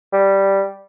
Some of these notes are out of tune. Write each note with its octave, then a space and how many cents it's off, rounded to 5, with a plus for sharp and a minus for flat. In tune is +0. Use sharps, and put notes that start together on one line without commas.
G3 -5